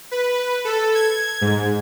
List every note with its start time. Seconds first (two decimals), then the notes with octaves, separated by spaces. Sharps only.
0.11 B4
0.65 A4
0.95 G#6
1.41 G#2